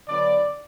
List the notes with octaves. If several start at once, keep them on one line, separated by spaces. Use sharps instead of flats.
D3 F#3 B3 D5